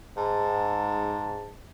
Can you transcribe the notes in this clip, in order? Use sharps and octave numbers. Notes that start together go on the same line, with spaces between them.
G#2 A5